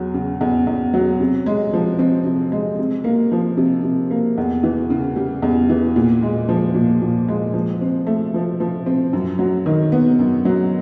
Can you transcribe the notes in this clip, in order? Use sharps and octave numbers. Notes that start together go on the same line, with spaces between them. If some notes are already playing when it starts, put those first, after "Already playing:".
Already playing: E2 F#3
C#3
E2
E2
F#3
C3
G#3
F3
C4
C3
G#3
C3
A#3
F3
C3
C3
A#3
E2
E3
C#3
G3
E2
E3
A#2
G#3
F3
A#2
A#2
G#3
F3
C4
A3
F3
F3
C4
F#2
F#3
D#3
B3
F#2
F#3